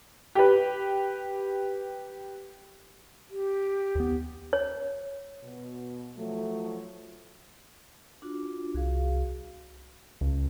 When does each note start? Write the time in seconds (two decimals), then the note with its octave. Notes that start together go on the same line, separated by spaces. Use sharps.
0.35 G4 B4
3.31 G4
3.95 D#2 B3
4.53 C#5
5.44 B2
6.17 F3 F#3 A3
8.22 D4 F4 F#4
8.74 C2 F#4 G#4 F5
10.21 C#2